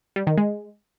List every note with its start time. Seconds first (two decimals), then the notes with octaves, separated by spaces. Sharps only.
0.16 G3
0.27 D#3
0.38 G#3